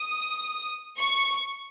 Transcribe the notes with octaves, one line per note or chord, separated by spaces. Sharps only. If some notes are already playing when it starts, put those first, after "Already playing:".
Already playing: D#6
C#6